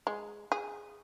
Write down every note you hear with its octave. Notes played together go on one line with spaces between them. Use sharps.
G#3
G#4